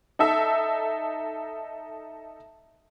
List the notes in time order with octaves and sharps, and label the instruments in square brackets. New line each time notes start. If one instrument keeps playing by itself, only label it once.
[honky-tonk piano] D#4 A4 E5